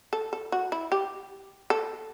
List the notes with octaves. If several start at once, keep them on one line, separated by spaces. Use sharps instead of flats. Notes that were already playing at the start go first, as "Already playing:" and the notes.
A4
A4
F#4
E4
G4
A4